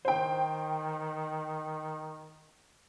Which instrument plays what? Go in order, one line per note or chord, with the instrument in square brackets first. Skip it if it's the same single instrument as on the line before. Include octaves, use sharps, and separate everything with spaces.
[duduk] D#3 [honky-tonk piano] C5 G5